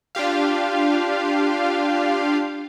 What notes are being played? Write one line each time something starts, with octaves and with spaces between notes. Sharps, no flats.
D4 F4 G4 F5